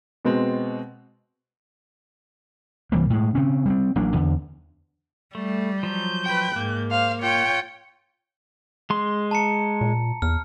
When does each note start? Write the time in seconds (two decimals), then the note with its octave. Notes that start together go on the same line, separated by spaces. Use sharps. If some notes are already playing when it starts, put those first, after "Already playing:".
0.25 B2 G#3 B3 C4
2.92 C2 E3 G3 A#3
3.10 A2 G#3
3.35 C#3 C4 C#4
3.66 G3 A3 C4
3.96 A1 F#3 A#3 D4
4.14 E2 D3
5.35 G3 A3
5.83 F3 F#3 G6
6.25 B4 G5
6.56 G#2 A#3
6.91 C5 F5
7.22 F4 C#5 G5
8.90 G#3 C6
9.31 A5 A#5 C#7
9.81 A#2
10.22 E2 F6